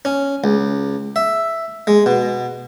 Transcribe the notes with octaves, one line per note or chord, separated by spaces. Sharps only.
C#4
C#2
E5
G#3
B2